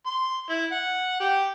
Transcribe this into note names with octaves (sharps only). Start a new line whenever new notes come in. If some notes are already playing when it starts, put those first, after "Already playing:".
C6
E4
F#5
G4